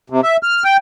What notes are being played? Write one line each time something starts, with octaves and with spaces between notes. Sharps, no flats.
C3
E5
F6
G5